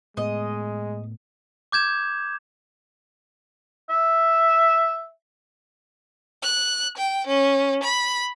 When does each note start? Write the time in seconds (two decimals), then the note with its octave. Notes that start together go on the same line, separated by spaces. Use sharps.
0.17 A2 G#3 B3 D#5
1.72 D6 G6 G#6 E7
3.89 E5
6.43 F#6
6.98 G5
7.27 C#4
7.83 B5